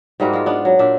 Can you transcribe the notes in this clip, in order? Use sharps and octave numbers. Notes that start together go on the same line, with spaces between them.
G#2 G3 A#3 F#4
G#3 F4
B3 D4
F#3
A#2 D4 E5